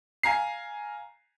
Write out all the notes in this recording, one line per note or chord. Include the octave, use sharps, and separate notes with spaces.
F5 G#5 A#5 C7